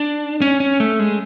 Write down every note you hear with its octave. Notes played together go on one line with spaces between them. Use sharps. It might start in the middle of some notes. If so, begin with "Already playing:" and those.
Already playing: D4
C#4
C#4
A3
G#3